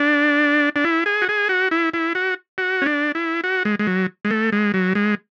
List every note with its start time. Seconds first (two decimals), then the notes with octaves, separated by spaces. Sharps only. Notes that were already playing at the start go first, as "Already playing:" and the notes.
Already playing: D4
0.76 D4
0.84 E4
1.06 G#4
1.22 F#4
1.29 G#4
1.49 F#4
1.71 E4
1.94 E4
2.15 F#4
2.58 F#4
2.82 C#4
2.86 D4
3.15 E4
3.44 F#4
3.65 G#3
3.79 G#3
3.87 F#3
4.25 G#3
4.31 A3
4.52 G#3
4.74 F#3
4.95 G#3